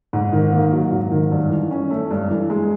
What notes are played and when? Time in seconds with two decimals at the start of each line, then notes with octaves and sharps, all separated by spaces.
0.13 G#2
0.33 D#3
0.52 A#3
0.72 F#3
0.91 G#2
1.12 D#3
1.32 G2
1.50 E3
1.71 C#4
1.91 A3
2.11 G2
2.30 E3
2.50 G#3